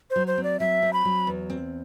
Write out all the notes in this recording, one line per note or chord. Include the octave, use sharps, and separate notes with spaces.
C5
F#3
C5
C4
D5
F#3 E5
C4
B5
F#3
E2
C4